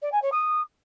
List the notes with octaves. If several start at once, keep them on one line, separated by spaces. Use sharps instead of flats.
D5
G#5
C#5
D#6